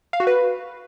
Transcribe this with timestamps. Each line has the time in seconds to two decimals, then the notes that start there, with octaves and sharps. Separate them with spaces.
0.13 F5
0.20 F#4
0.27 B4